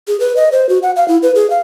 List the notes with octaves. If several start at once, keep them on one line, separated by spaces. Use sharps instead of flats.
G#4
B4
D#5
C5
F#4
F#5
F5
E4
B4
G#4
F5